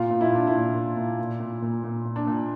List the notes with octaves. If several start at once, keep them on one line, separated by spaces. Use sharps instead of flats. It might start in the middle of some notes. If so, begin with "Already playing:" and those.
Already playing: A#2 F4
A#2
E4
A#2 D4
E4
A#2
A#2
A#2
A#2
A#2
A#2
A#2
A#2
D4
A#2